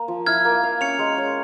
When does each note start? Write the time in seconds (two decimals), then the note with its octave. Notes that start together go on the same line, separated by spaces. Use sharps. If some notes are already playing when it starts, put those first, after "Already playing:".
Already playing: A#3
0.08 F3
0.26 E4 F6 G#6
0.45 A#3
0.63 F5
0.81 C#4 C#7 F7
0.99 G#3
1.18 C#5